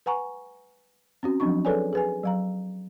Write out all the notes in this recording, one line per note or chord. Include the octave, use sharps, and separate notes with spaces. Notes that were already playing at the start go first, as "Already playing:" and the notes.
B4 F#5 G#5 A#5 C#6
C4 C#4 F#4
F3 F#3 C4 D4 C#6
G#4 A4 B4 C#5 D5 G#5
G#4 B4 G#5
F#3 F5 A#5